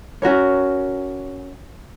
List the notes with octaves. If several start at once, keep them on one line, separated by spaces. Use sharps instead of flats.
C#4 F#4 A#4 C#5